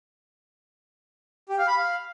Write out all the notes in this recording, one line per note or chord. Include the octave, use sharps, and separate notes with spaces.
G4
F5
B5
F5